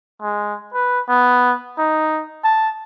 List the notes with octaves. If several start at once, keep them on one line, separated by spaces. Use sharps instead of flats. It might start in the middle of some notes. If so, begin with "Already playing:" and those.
G#3
B4
B3
D#4
A5